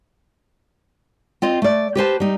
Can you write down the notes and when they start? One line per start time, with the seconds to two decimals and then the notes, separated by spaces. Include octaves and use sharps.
1.42 C4 F4 D#5
1.62 A3 D5
1.95 G4 B4 C5 A5
2.20 G3 D#4